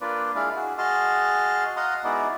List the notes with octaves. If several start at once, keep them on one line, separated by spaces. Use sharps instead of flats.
A#3 D4 F4 B4 D5
G#3 D4 E4 F5
F#4 G#4
F#4 G#4 D#5 A5 C6 F6
D#5 F5 F#5 A#5 C6 D#6
G#3 B3 D#4 E4 F#4 D5